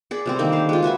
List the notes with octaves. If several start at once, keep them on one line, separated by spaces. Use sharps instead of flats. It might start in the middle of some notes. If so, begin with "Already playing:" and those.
G#4 D5 B5
C3 G3 C4
D3 D#3 A#3
G4 C5 F5
G#3 F4
F#4 B4 E5 G#5